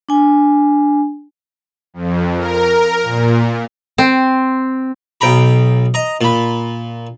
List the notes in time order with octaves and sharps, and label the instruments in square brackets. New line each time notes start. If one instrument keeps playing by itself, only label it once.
[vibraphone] D4 G#5
[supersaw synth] F2
A#4
A#2
[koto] C4
[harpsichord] B1 G5 A#5 B5
D#5 A#5
A#2 B5